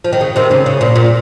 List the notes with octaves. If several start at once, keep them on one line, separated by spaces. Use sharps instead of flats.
F3
D#3
C#3
C3 D#3
C#3
C#3
A#2
A#2